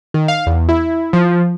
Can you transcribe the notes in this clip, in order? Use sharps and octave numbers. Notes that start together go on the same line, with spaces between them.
D#3
F5
E2
E4
F3